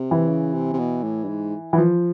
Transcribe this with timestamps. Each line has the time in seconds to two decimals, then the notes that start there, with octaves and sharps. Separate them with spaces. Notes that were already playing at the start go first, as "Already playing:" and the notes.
Already playing: C3
0.11 E3
0.29 C#3
0.54 C3
0.73 C3
0.79 B2
1.04 A2
1.24 G2
1.28 G#2
1.73 E3
1.78 F3